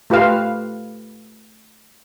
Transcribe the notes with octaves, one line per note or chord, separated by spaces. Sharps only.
A3 F4 G4 B4 F5